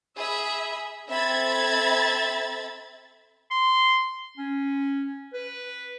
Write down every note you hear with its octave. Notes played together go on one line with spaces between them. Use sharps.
G#4 E5 B5
C4 A4 E5 B5 G#6 A6
C6
C#4
B4